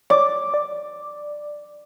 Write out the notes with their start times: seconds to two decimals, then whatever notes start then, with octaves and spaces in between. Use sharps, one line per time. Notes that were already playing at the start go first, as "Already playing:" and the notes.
0.10 C#5 D5 D6
0.54 D5